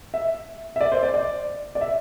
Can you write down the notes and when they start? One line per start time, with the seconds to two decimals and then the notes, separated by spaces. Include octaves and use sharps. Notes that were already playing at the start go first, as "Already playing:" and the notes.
0.14 E5
0.76 E5
0.81 D5
0.92 C5
1.03 D5
1.14 D5
1.75 D5
1.81 E5